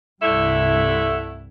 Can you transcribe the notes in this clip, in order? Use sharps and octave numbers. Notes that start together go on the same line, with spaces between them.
C2 G2 D3 A3 E4